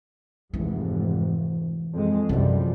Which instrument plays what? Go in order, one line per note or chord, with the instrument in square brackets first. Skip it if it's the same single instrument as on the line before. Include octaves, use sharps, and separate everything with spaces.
[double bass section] F1 G#2 [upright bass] E3
[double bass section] F2 G#3
[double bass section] F#2 F3 G3 [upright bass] C3 E3